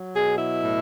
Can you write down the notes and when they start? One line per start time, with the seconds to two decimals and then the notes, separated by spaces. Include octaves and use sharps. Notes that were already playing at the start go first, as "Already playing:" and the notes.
Already playing: F#3
0.16 B2 G#4
0.38 E4
0.62 A2